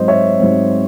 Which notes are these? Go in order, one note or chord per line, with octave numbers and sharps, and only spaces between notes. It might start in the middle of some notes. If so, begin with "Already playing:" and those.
Already playing: G#2 F#3 C4 C5 D#5
C#5 E5
G#2 F#3 C4